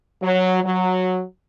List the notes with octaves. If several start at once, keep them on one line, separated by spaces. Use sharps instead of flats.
F#3
F#3